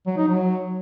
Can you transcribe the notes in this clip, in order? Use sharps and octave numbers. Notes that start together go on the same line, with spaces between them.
F#3
D#4
F#3